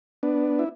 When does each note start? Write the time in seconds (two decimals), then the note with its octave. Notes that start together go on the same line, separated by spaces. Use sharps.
0.23 B3 D4
0.59 E4